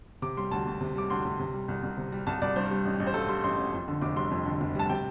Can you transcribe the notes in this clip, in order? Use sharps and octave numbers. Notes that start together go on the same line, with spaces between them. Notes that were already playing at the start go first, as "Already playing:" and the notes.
C3 D6
G3 C6
D2 A5
D2
C3
G3 D6
D2 C6
D2
C3
G3
C2
C2
C3
G3
C2 A5
C2 D5
G2 C5
G3
A1
A1
C5
G2 A4
G3 C6
A1 C6
A1
F2
D3
F1 D6
G3 C6
F2
D3
F1
G3 A5
C3 G5